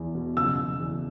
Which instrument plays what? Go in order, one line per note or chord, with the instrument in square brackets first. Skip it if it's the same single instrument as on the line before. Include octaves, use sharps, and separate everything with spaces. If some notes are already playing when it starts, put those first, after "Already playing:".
Already playing: [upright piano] E2
B2
[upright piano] F#1 [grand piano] E6
[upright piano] F#1
E2